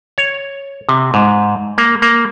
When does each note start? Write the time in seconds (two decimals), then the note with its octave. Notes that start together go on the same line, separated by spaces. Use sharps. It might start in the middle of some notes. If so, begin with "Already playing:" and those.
0.18 C#5
0.89 C3
1.14 G#2
1.78 A#3
2.02 A#3